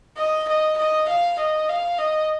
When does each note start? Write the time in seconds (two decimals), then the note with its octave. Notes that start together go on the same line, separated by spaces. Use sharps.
0.17 D#5
0.48 D#5
0.77 D#5
1.08 F5
1.39 D#5
1.69 F5
1.98 D#5